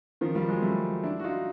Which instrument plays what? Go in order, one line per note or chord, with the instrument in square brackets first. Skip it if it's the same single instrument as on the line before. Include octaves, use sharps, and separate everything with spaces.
[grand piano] D#3 F3
F3 G3
F#3 G#3
G3 A3
D4 E4
F#4
D#4 F4